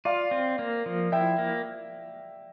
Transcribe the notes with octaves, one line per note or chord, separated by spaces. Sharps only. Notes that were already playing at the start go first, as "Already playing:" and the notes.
F4 D5 F5
C4
A#3
F3
E4 E5 G5
A#3